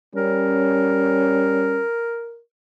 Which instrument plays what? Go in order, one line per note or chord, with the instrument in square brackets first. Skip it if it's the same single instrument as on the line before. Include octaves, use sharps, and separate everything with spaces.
[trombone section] G3 C#4 [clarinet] A#4